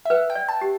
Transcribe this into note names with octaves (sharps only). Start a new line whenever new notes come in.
E5
B4 F#5
G5
D5
A5
G4